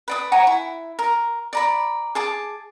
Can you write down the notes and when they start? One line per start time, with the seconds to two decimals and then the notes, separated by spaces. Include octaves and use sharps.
0.08 B4 D5 D#6
0.32 F#5 G#5 A#5 C#6
0.47 E4
0.99 A#4
1.53 D5 A#5 B5
2.15 G#4 A5 D6